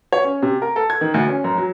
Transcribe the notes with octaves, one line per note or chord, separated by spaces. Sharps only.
C#5
C#4
C3
A#4
A4
G#6
D#3
D2
C#4
F#2
F#3